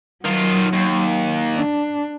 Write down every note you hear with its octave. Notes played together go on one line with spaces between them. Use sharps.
D#3 F#3 F4
D#2
D4